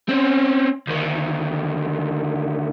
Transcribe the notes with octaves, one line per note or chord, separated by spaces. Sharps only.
C4 C#4
D2 D#3